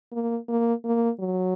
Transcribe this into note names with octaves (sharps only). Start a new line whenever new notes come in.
A#3
A#3
A#3
F#3